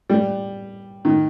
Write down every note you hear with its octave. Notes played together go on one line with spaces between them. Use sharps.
G3
D#3